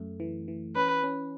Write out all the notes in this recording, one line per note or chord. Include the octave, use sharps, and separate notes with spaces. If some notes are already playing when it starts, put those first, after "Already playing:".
Already playing: F#2 A3
E3
E3
C#4 B4
C#4